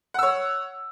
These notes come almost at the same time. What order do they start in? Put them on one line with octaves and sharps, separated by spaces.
F#5 E6 C#5